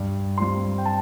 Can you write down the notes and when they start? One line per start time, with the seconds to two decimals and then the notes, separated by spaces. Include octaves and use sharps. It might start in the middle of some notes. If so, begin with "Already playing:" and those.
Already playing: G2
0.38 G3 C4 F4 C6
0.78 G5
0.85 A5